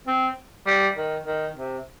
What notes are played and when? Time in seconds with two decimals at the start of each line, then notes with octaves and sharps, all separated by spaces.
0.07 C4
0.67 G3
0.97 D#3
1.26 D#3
1.57 C3